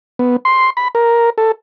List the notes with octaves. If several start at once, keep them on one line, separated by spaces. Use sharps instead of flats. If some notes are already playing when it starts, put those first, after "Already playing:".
B3
C6
B5
A#4
A4